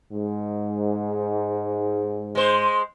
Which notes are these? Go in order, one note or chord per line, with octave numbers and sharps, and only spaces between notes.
G#2
G#3 C5